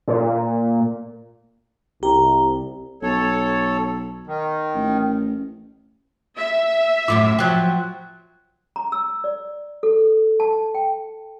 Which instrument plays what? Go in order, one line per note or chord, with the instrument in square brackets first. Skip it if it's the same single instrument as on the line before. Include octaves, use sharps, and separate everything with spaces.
[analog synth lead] A#2
[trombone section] C2 [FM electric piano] G4 [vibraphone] A#5
[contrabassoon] B1 [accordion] A4 C#5
[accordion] D#3
[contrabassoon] A1
[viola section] E5
[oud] F#2 A2 F4 [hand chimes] D6
[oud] F3 F#3 [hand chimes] G5 F#6
[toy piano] A#5
E6
D5
A4
A5
G5